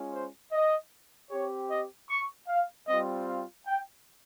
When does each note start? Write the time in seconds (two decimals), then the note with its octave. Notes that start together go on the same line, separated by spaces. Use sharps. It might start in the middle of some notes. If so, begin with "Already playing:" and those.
Already playing: G#3 C#4 F4
0.14 C5
0.52 D#5
1.31 C4 G4 C#5
1.71 D#5
2.10 C#6
2.48 F5
2.88 G3 C4 F4 D#5
3.28 F5
3.67 G5